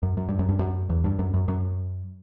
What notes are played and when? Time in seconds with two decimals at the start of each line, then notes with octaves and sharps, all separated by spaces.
0.03 F#2
0.17 F#2
0.29 G2
0.39 F#2
0.49 G2
0.59 F#2
0.90 E2
1.04 G2
1.19 F#2
1.34 F#2
1.48 F#2